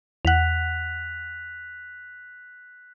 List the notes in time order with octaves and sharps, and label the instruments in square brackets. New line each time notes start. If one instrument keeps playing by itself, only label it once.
[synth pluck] E2 F#5 [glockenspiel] F#6 B6 F7